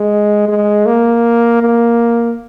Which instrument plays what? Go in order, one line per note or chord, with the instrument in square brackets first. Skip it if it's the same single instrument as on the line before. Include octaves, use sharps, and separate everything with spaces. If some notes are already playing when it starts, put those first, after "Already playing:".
Already playing: [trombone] G#3
G#3
A#3
A#3